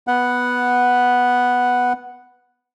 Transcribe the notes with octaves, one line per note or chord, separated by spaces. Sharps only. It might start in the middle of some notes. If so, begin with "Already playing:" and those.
B3 F#5